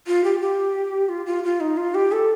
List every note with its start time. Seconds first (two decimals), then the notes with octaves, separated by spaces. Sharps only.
0.07 F4
0.24 G4
0.40 G4
1.09 F4
1.26 F4
1.44 F4
1.60 D#4
1.77 F4
1.94 G4
2.12 A4